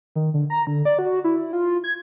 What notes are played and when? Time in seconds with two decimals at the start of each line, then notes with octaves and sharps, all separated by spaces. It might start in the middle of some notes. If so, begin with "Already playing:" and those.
0.16 D#3
0.34 D3
0.50 A#5
0.67 D3
0.85 D5
0.99 F#4
1.24 E4
1.53 F4
1.84 G#6